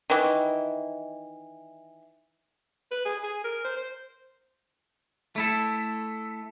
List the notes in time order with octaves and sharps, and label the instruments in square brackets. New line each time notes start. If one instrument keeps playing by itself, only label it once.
[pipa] D#3 E3
[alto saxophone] B4
G#4
G#4
A#4
C5
C5
[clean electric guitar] A3 E4 A4